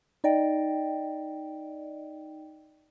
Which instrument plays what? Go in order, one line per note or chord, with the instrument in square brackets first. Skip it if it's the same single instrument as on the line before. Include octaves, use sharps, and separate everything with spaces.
[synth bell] D#4 D5 D#5 G5